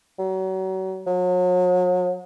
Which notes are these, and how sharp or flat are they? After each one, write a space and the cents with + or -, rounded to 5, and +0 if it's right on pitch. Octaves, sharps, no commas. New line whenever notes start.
F#3 +35
F#3 -40